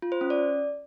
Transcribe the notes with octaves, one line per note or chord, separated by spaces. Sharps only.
F4
C5
C#4
D5